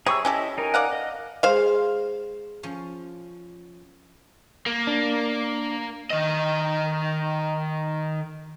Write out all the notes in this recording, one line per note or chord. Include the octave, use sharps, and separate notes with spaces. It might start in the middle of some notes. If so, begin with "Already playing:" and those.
C3 G3 G#4 C#5 C#6 E6
C#4 E4 G4 A4 D#5
D#4 A#4 G#5
D5 F5 F#5
D#5
G#3 C5 F5
F3 C#4
A#3
D4
D#3 D#5